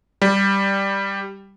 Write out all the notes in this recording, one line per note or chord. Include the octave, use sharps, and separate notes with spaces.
G3